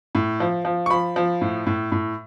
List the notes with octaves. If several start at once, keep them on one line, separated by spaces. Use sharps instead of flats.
A2
F3
F3
C#6
F3 B5
F3
A2
A2
A2